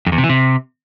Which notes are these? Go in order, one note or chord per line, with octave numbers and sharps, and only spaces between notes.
F2
E2
C3
E3
C3